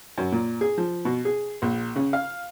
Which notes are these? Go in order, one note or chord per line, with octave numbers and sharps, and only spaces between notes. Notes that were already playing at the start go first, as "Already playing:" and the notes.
F#2
A#2
G#4
F3
B2
G#4
A#1
C#3
F5